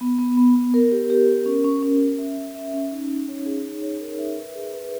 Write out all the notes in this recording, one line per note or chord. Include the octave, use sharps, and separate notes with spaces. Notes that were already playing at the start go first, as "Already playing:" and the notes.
B3
B3
B3
B3
A#4
G4
G4
A#4
C#4
C#4
C#4
C#4
E5
C#4
E5
C#4
D#4
D#4
C#5
G#4
D#4
C#5
A#4
E5
B4
G#4
B4